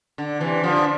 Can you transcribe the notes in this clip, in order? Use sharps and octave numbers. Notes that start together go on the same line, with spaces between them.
D3
C3 E3
D3 F3